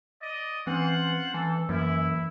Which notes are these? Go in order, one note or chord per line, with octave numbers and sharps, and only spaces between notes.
D5 D#5
E3 C4 C#4 F4 C5 F#5
E3 A4
F#2 E3 F#3 A#3 E4